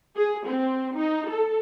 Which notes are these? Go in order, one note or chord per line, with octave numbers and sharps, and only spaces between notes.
G#4
C4
D#4
A4